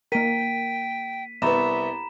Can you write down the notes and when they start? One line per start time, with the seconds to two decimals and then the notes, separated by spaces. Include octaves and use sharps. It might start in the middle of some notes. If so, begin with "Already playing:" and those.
0.12 A#3 A#4 G5 B6 D#7
1.42 C2 B3 E5 A#5 B5 E7